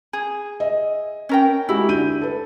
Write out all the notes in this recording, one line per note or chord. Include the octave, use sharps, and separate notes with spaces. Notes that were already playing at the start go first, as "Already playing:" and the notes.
G#4
D#5 E5
C#4 A#4 G5
G#3 E4 F#4 G4
D3 G6 D#7
A4 B4